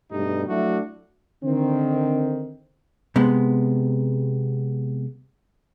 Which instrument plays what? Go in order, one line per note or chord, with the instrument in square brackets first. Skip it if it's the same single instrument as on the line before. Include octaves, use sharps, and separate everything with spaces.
[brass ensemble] G2 B2 G3 A3 D#4
F#3 A3 D4 E4 F#4
D3 D#3 C4
[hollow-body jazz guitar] C3 G#3 B3